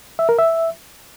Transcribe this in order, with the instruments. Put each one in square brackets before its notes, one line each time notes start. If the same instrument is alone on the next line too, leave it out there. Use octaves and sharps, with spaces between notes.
[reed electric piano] E5
A#4
E5